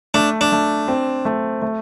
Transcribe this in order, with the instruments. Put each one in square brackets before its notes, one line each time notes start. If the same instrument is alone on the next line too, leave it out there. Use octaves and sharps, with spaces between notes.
[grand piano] A3 [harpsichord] D4
[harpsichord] D4
[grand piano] A3
C4
A3
A3